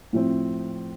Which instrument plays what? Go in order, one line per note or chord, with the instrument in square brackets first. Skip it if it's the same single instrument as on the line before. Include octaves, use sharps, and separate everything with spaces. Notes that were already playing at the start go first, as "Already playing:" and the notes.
[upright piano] A2 F3 C4